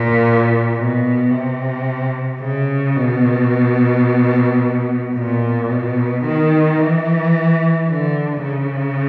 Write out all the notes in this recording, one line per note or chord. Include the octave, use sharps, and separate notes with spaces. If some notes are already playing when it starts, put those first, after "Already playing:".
Already playing: A#2
B2
C3
C#3
B2
A#2
B2
D#3
E3
D3
C#3